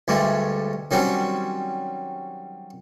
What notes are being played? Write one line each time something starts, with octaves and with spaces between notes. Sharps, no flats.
D2 G2 G#3 A3
D#3 F#3 G3 C4 C#4